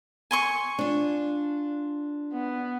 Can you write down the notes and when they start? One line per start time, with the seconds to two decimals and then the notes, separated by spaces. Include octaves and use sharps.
0.31 G#5 C6 C#6
0.79 D4 F4
2.33 B3